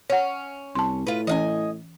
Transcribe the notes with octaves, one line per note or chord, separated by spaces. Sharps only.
C#4 C#5 F#5
C2 A5 C6
A2 F4 B4
E3 C#4 D#5 F5 G#5